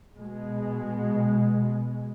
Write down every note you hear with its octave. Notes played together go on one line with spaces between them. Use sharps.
B2 G#3